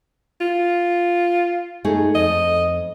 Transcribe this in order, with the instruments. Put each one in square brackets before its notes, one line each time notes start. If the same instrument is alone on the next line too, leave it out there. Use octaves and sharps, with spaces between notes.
[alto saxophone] F4
[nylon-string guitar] A3 D#4 G#4
[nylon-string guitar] F2 [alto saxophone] D#5